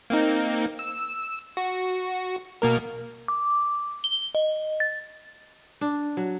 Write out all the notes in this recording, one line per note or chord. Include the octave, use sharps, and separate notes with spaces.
A#3 C4 D#4
E6
F#4
B2 A#3 A#4
D6
G7
D#5
A6
D4
F#3